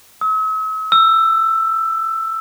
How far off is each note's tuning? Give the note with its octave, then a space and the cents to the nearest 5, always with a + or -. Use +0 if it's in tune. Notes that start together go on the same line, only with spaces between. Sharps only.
E6 -45
E6 +10